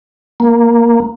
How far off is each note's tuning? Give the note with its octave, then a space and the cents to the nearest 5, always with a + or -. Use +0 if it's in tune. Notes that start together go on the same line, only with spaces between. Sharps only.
A#3 +5